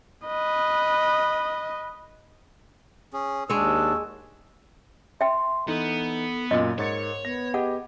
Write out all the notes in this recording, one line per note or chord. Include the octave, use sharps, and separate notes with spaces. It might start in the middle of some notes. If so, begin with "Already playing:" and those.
B4 D#5
C#4 G#4
D#2 G#3 D4 F#4 C#5 E6
E5 G5 C6
E3 B3 D#4 A4
F#2 A#2 D#5
G#2 A#4 C#5 A6 C#7
B3 A#6
G4 G#4 D#5 F#5